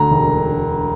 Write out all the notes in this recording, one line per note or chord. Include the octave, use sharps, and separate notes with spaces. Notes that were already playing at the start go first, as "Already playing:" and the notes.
Already playing: D2 A#5
E1